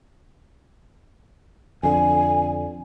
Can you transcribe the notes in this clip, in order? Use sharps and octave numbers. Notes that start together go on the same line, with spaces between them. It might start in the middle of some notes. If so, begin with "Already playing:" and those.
F2 D3 G#5